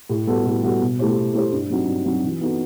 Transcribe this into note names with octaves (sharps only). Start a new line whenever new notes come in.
A2
G3 B3 F#4 A4
A2
G3 B3 F#4 A4
B2
A3 E4 G4 C5
B2
A3 E4 G4 C5
G2
F#3 C4 D#4 F#4
G2
F#3 C4 D#4 F#4
E3
B3 D#4 F#4 A4